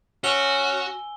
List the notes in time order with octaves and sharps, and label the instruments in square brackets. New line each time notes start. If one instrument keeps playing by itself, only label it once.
[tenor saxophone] C#4 [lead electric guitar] F#4 [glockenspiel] G#5 E6 G7